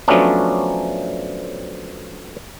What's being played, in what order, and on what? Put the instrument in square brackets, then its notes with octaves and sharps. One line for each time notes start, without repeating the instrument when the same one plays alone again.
[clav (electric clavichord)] F3 F#3 A3 B3 C#4 D4